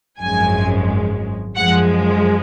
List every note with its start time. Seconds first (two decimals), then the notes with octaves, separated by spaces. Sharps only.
0.20 G#1 F#2 F3 G#3 G#5
1.56 F#2 F3 G#3 F#5